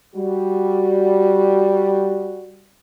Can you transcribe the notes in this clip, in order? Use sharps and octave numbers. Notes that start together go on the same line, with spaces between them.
G3 F#4